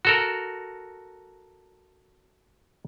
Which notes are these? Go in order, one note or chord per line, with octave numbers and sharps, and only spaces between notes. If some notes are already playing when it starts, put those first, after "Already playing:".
F#4 A4 A#4